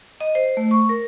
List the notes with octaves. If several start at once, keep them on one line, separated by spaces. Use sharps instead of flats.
D#5
C5
A3
C#6
A#4